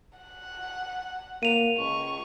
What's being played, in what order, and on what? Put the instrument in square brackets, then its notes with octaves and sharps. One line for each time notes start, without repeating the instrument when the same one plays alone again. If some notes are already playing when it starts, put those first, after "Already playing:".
[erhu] F#5
[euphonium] A#3 [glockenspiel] D#7 F7
[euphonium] C#2 [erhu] C#6